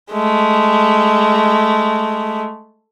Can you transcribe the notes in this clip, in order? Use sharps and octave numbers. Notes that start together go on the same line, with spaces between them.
G#3 A3